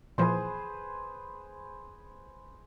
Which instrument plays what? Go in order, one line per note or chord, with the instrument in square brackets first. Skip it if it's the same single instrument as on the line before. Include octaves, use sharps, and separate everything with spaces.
[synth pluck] A#2 E3 F3 [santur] G#4 B4 C5